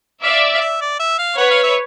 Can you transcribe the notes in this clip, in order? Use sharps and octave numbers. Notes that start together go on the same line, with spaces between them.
D5 E5 F5
F5
E5
D5
E5
F5
B4 C#5 F#5
F5
E5